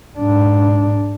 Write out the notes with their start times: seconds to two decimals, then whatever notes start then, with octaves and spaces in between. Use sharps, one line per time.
0.19 G#2 D4